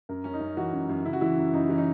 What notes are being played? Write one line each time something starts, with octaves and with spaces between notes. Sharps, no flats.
F#2 A#4
F#2 C#4
D#4
F#2
E3 F#4
F#2
F#2
C#3 E4
F#4
E3 E4
F#2
F#2 D#4
E3 C#4
D#4